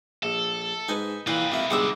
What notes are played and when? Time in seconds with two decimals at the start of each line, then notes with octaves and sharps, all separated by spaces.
0.23 A#1 A4
0.88 G#2 D#4 B4 G#5
1.27 A#2 E3 D#4 B4 F5 G5 F#6
1.52 G#1 A#3 E5
1.70 G1 G3 G#3 F#5 D6 E6